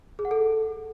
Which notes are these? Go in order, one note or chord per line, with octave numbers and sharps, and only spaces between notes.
G#4
F#5
A4